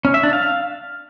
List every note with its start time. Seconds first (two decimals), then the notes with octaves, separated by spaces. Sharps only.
0.05 C#4
0.14 E5
0.23 D4
0.33 F5